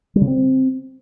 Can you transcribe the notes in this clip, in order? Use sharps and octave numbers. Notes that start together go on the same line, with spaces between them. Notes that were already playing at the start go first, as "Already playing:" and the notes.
G3
C#3
C4